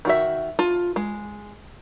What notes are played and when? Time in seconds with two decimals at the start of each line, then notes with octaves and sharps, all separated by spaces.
0.05 D#3 F#4 E5
0.59 F4 A5
0.96 G#3